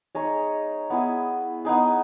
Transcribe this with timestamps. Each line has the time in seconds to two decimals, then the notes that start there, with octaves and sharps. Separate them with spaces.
0.15 G#3 D#4 G#4 C#5
0.90 B3 E4 G#4
1.65 B3 D#4 G#4